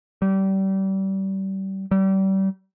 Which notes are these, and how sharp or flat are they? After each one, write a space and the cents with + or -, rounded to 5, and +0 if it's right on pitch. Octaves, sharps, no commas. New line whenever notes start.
G3 -30
G3 -30